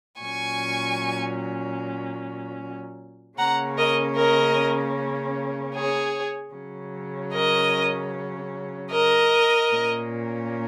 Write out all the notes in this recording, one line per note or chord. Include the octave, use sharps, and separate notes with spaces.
A#2 F#3 C#4 G#5 C#6
C#3 A#3 C#4 F#5 A#5
A#4 D#5
A#4 D#5
G#4 C#5
C#3 F#3 C#4
A#4 D#5
A#4 D#5
A#2 A#3 C#4